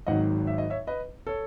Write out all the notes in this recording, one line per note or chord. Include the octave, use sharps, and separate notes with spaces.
G#1 G#2 D#3 F#3 D#5 F#5
E5
D#5
C#5 E5
B4 D#5
A4 C#5